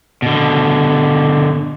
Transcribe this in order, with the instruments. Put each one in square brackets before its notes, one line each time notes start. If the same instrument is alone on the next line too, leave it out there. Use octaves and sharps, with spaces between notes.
[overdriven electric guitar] B2 D3